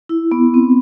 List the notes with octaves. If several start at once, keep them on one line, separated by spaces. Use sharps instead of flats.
E4
B3
C4